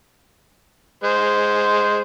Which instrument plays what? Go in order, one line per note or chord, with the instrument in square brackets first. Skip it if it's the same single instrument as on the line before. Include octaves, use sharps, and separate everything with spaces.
[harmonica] G#3 C5